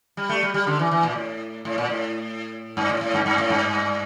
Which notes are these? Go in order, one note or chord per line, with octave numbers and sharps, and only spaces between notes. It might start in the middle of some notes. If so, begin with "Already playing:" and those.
G3
A3
G3
G3
D3
E3
E3
A#2
A2
A2
A#2
A2
G2
A2
A2
G2
G2
A2
G2